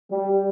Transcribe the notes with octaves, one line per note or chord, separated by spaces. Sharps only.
G3